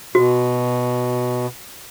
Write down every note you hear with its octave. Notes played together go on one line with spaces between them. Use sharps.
B2 F#4